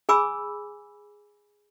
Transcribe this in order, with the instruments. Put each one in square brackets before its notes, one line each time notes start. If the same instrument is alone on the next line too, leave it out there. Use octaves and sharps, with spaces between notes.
[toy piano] G#4 G#5 B5 D6 E6